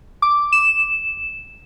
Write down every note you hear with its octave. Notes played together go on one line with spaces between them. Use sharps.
D6
E7